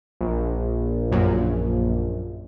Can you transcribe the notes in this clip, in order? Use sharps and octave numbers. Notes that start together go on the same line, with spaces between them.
A#1
F#2 A#2